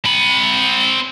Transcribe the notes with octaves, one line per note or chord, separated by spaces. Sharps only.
C4 B5